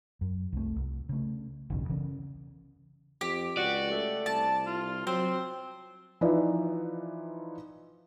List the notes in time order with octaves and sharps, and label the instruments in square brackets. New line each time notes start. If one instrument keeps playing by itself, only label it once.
[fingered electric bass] F#2
C2 A3
C2
C#3 A3
F#1 B1 E2 C#3
C#3 E3 C#4
[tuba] F2 [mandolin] G4
[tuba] C#2 [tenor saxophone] F#4 [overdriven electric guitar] D5
[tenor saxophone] A3
[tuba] C2 [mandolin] A5
[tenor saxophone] F4
[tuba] F#3 [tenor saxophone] C4 [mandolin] C5
[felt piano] E3 F3 D#4 B4 D5 E5